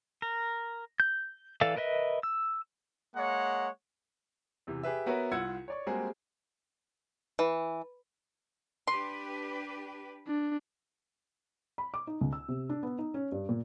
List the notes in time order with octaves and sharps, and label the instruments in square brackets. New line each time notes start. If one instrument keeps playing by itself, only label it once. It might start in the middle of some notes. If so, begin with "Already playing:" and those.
[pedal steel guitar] A#4
G6
E3 A4 D5 F5
A#4 B4 D#5 E5
E6
[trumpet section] G#3 A#3 C#5 F#5
[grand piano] E2 C3 E3
G4 G#4 B4 E5
B3 F#4 A#4 B4 C#5 E5
C2 F4 F#5 E6 G#6 C#7
C#5 D5 C#6
G3 G#3 A#3 C4 F#4 G#4
[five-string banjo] E3
[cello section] D4 G4 B4 [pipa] C6
[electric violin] D4
[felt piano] B5
D6
D#4
C#2
E6
C3
D4
B3
D#4
C#4
G2
A#2